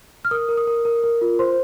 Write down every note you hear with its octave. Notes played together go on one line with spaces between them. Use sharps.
F6
A#4 D#6
A#4
D#6
A#4
A#4
A#4
F4
C5 C6